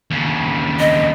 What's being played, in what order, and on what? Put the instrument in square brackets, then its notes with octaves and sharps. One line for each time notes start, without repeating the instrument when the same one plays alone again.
[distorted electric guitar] D#2 C#3
[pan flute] D#5